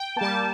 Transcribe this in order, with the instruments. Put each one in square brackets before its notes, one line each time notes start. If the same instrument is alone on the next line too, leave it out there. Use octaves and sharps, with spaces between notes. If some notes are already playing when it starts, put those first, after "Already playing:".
Already playing: [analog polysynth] G5
G3 A#3 A5